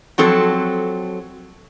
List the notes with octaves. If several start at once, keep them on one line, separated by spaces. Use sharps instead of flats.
F3 F#3 C4 A4